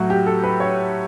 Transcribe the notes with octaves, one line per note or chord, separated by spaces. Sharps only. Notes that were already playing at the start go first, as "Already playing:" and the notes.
Already playing: A2 F#3 F#4
G4
A4
B4
C#5